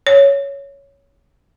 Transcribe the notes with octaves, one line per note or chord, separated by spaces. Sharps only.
C#5